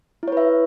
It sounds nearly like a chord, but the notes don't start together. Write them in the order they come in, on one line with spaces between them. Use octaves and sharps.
E4 C#5 B4 E5